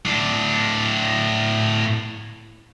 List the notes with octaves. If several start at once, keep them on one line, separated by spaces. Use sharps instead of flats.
A2 D4